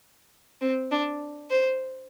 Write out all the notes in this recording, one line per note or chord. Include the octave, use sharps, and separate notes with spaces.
C4
D4
C5